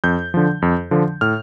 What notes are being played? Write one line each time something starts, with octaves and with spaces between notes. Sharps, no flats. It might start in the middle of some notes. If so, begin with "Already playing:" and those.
F2 G6
D3 F3
F2
D3 F3
A2 F6